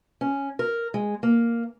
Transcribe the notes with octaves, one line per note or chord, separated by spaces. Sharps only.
C#4
A#4
G#3
A#3